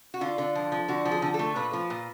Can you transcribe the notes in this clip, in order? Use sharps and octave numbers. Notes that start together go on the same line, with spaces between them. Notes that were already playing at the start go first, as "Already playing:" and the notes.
F#4
D3 F4
D3
F3
F3
D3 F#4
F3
G#4
D3
A4
A3
A#2 B4
F3
A#2